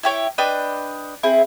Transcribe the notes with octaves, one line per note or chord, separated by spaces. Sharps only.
E4 G4 C#5
D4 B4 D#5 G5
C4 E4 G#4